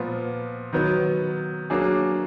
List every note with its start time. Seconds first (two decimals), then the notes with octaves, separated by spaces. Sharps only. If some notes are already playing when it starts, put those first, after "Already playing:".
Already playing: A#2 F3 B3
0.73 D#3 F#3 B3
1.70 F#3 A#3 D4 G#4